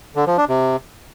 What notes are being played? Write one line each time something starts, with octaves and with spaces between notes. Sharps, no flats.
D3
F3
D4
C3